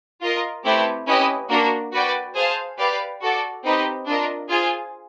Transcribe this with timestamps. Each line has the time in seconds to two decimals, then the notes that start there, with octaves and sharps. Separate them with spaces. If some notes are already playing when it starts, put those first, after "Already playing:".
0.22 F4 A#4 D#5
0.65 A3 C4 E4 G4 B4
1.07 C#4 E4 G4 B4 D#5
1.49 A#3 D4 F#4 A#4
1.93 F#4 B4 D5 G5
2.35 G#4 C5 F5 A5
2.78 G4 B4 D5 F5
3.21 F#4 A4 D5
3.64 C4 D#4 G4 B4 D#5
4.07 D4 F4 A#4 D#5
4.49 F4 G#4 C5 F5 G#5